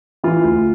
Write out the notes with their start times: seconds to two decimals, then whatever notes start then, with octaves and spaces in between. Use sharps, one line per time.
0.24 E3 F4
0.43 D2